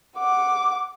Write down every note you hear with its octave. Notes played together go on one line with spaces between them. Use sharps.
F#5 D6